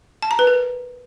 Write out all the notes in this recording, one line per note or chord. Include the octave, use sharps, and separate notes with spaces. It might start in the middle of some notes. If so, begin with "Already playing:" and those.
A5
A#5
B4
A#4